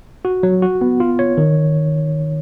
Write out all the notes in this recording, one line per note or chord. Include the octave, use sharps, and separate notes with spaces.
F#4
F#3
F#4
B3
F4
C#5
D#3